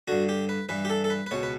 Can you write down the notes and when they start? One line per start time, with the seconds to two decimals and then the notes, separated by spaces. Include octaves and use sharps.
0.08 G2 D3 F#4
0.29 G4
0.49 B4
0.69 G2 E3 B4
0.85 G4
0.90 A4
1.04 A4
1.10 B4
1.26 B4
1.31 C#2 B2 C#5
1.43 B4